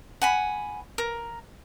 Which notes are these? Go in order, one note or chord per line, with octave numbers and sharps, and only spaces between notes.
F#5 G#5 B5
A#4